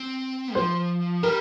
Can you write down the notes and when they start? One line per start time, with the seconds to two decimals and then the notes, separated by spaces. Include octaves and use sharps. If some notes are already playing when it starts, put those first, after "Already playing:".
Already playing: C4
0.55 F3 C5
1.23 G3 A#4